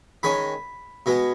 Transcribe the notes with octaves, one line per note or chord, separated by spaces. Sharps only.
D#3 G#3 C#4 B5
B2 G#3 B3